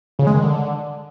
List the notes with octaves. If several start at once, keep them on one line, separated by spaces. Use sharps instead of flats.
C#3
G#3
D#3
D3